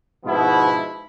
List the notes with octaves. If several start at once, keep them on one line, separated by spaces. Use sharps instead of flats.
G#2 B2 F3 B3 E4